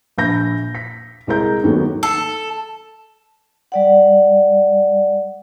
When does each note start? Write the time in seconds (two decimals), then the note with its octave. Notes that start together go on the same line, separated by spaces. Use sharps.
0.18 A#1 B5 G6 A#6
0.75 B6
1.27 C2 G#3 A#4 A#5 G6
1.63 D#2 G#2 D#3 F#3 A3 B3
2.03 A4
3.72 G3 D5 F#5